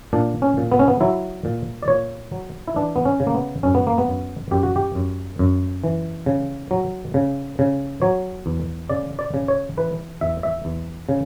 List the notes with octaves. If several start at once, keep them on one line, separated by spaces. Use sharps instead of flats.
A#2 D4
C#4
A#2
B3
C#4
B3
F#3 E4
A#2
D5
A#2 C#5
F#3
E4
E3 D4
B3
C#4
C#3
A#3
B3
F#2 C#4
B3
A#3
B3
F#2
F#2 G4
F#4
G4
F#2
F#2
E3
C#3
F#3
C#3
C#3
F#3 C#5
E2
C#3 D5
D5
C#3
C#5
E3 B4
E2 E5
E5
E2
C#3